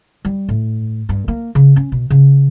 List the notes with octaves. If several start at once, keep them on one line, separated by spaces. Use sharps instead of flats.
G3
A2
G2
A#3
C#3
C#4
B2
C#3